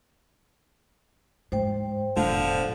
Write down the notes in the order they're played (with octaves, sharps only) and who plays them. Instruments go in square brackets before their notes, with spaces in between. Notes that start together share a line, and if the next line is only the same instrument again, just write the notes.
[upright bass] G#2 [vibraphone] C5 G5
[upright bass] E1 A1 [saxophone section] D3 F3